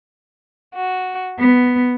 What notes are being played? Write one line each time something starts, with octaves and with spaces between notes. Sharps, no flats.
F#4
B3